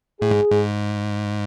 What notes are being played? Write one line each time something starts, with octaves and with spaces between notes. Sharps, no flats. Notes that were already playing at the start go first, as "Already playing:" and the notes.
A2 G#4
G#2
G#2